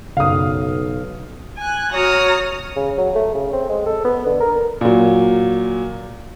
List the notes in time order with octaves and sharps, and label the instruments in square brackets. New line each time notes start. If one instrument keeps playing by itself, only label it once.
[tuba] B1 [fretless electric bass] F#2 C#3 [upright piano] F5 D#6
[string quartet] G#5 F#6
F#4 C#5 A#5 D#6 F6
[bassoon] C#3
F#3
A3
C#3
C4
G#3
A4
B3
D3
A#4
[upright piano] A#2 F#3